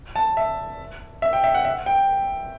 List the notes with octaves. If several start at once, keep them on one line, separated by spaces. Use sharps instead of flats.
A5
E5
E5
G5
E5
F#5
E5
G5